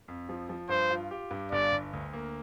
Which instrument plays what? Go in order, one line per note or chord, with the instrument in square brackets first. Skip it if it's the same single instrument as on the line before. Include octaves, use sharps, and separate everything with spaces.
[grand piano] F2
F3
F3
[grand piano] G2 [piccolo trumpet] C5
[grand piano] F4
G4
G2
[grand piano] G1 [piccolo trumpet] D5
[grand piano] G1
D2
A#3